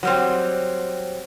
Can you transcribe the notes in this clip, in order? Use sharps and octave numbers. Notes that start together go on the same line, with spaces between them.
F#3 G3 C4